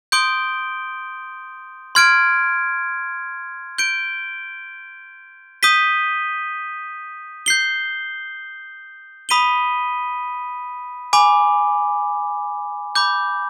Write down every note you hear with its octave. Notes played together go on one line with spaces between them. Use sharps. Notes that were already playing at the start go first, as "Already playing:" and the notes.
C6 D#6 G6 D7 G7
C6 F6 G#6 D7
G6 D7 G7
D#6 G6 B6 D#7 G7
G6 C7 G7
B5 D#6 B6 D#7 G7
G#5 B5 D6
B5 D6 G6